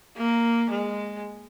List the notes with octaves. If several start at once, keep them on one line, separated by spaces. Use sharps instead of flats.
A#3
G#3